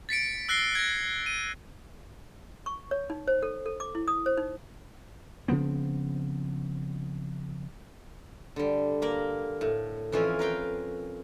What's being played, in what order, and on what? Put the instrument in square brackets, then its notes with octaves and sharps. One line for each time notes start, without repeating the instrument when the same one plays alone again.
[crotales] A6 B6 C#7 D7
E6 F#6 A#6 C7 G7
G#6 A#6
D#7
[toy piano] C#6
C#5
D#4
C5
A4
A4
D6
E4
D#6
C5
D#4
[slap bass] C#3 F3 B3 C4
[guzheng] D3 G3
A#3 A#4 A#5
A2
F2 E3 C#4 F4 G#5
A#4 B4 F5 G5